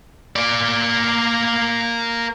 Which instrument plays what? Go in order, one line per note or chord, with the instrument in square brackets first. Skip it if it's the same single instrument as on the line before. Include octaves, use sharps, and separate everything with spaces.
[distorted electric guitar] A#3 D5